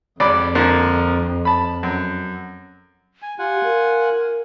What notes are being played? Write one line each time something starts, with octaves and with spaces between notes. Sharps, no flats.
G#1 F2 D5 B5
D3 F3 A#3
A5 B5
F#2
G#5
F4 G4 F#5 G#5
A#4